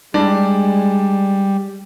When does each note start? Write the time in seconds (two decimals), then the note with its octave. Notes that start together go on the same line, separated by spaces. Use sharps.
0.14 G3 G#3 D4